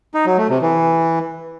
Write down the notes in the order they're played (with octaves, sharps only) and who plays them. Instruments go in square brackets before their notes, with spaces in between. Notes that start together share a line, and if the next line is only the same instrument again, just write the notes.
[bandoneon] D#4
F#3
A3
C3
E3